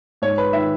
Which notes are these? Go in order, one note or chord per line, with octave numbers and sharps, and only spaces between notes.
G#2 C#5
B4
D#3 E5